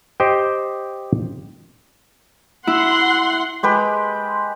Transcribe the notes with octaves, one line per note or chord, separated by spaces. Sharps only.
G4 C5 D#5 G5
E4 F#5 C6
G#3 G4 B4